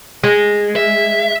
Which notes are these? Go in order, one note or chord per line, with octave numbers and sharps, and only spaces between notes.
G#3
E5